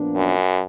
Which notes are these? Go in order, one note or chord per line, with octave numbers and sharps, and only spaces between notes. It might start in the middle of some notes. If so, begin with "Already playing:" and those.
Already playing: A#2 F3 B3 D4
F#2